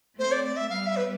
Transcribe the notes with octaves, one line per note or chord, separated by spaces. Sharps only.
A3 C4 C5
D5
D5
E5
G3 B3 F5
E5
B4